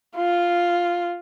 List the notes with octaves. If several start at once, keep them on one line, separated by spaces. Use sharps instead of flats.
F4